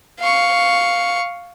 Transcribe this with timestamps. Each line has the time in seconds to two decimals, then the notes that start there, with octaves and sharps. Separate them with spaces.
0.20 F5 C#6